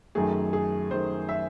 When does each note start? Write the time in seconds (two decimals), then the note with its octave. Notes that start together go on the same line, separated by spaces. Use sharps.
0.15 F#2 D#3 A3 G#4
0.53 G#4
0.91 F#2 D#3 A3 C5
1.29 E5